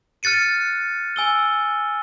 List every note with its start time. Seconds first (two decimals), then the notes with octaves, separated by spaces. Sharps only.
0.23 F6 F#6 A6 C#7 D#7
1.16 G#5 E6 G7